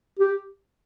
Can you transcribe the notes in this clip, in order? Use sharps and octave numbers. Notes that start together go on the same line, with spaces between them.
G4